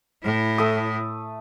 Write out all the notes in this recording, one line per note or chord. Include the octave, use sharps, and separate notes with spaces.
A2 E4
A3 D#6